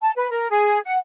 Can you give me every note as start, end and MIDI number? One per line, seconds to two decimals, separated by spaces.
0.02 0.11 81
0.16 0.30 71
0.31 0.48 70
0.50 0.79 68
0.84 0.97 78